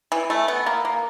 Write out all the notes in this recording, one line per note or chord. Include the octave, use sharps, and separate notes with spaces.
E3
A3
B3
A#3
A#3